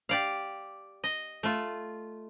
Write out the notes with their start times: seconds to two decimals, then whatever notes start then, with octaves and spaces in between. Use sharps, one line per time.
0.09 G4 D5 F5
1.04 D#5
1.43 A3 F4